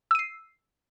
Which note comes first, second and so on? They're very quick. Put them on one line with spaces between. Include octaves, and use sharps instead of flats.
E6 D#7 C7